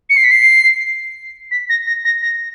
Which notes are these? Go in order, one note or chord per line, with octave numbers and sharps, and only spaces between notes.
C#7
C7
B6
C7
B6
A#6
A#6
A#6
A#6